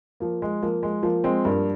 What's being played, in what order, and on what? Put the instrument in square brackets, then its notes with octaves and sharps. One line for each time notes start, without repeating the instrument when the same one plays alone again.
[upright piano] F3 A#3
G#3
F3 A#3
G#3
F3 A#3
G#3 C4
G2 A#3